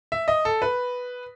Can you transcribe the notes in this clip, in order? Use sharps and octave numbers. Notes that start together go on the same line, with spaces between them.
E5
D#5
A4
B4